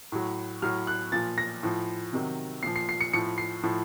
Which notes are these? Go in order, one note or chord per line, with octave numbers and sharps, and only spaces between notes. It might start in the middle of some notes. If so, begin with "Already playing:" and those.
A2 F#3
A2 F#3 F6
F#6
A#2 F3 A6
A#6
A2 F3
C3 D#3 F#3
A#2 F3 C7
C7
C7
C#7
A2 F3 C#7
C7
A2 F3